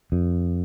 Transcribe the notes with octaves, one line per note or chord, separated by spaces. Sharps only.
F2